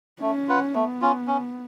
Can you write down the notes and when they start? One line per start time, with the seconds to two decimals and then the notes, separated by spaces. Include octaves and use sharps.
0.21 A3 C#4
0.48 F4 B4 F#5
0.74 A3 B3
1.02 C#4 F4
1.27 C#4